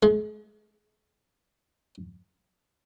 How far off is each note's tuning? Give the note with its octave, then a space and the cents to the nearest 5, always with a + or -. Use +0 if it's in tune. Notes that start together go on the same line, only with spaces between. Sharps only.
G#3 +40